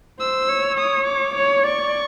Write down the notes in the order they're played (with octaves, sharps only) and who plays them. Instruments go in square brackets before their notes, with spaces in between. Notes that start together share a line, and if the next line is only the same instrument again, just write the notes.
[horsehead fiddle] C5 [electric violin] E6
[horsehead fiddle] C#5
[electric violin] D#6
D6
[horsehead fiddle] C#5
[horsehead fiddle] D5 [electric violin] C#6